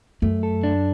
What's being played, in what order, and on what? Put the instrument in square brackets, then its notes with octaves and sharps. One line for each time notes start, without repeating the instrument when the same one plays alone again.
[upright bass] F#2 [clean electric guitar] A3
[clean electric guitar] A4
D4